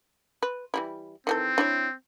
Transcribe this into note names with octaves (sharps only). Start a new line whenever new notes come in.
B4
E3 G3 E4
D#3 E3 C4 A4
D4 E4 C#5